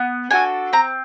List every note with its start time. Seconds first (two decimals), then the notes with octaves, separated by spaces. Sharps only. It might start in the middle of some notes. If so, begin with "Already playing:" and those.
Already playing: B3
0.31 D4 F#4 A4 G#5
0.73 C4 A#5